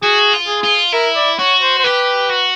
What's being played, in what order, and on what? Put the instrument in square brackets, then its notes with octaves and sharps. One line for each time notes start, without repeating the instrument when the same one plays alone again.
[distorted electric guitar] F#4 [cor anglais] G#4
[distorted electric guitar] F4
[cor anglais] G#4
[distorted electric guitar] F4
[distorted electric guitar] E4 [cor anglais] A#4
[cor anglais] D5
[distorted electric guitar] F#4 [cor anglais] C#5
[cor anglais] C5
C5
[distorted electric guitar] G4 [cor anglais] B4
[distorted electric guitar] F#4